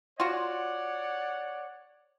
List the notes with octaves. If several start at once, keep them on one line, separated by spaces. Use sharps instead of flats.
F4 F#4 C#5 D5 F#5